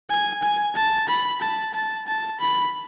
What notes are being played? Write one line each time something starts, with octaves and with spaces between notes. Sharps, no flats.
G#5
G#5
A5
B5
A5
A5
A5
B5